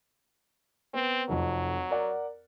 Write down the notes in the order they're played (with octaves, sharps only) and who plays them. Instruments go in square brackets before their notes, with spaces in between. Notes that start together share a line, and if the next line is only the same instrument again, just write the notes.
[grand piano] B3 [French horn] C4
[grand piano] F1 F2 [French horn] F#3
[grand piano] A#4 D5 F#5